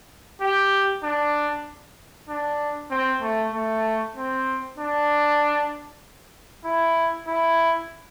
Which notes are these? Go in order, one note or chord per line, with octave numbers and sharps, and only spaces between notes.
G4
D4
D4
C4
A3
A3
C4
D4
E4
E4